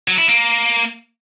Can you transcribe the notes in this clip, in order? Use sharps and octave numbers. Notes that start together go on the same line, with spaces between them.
F#3
E4
A#3